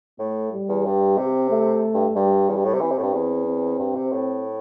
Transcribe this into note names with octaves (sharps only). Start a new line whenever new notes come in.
A2 A3
G3
E2
G2
C3 C4
A3
G2
G2 G3
E2
G2
A2
C3
E3 C4
C3
A2
G2
E2 C4
C4
G2
C3
A2